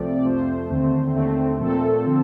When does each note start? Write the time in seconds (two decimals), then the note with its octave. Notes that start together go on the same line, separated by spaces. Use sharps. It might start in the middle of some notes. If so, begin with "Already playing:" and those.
Already playing: C2 C3 F3 A3 C4 D5
0.15 D5
0.25 F2 C3 F3 A3 C5
0.70 D#2 D3 A3 C4
1.15 D#2 D3 A3 C4
1.60 A#2 F3 A3 C4 A4
2.06 D3 F3 C4